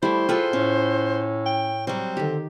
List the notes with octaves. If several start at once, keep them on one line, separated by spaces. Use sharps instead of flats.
G3 A3 E4 C5
F4 G#4 A4 B4 G5
A2 C#4
G5
F#3 G3 C4
D3 D#3 G4